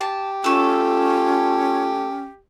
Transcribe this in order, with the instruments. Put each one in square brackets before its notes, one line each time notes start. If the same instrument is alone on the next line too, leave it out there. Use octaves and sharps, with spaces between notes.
[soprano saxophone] G4 [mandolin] A5
[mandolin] A3 A4 [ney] C#4 [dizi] F4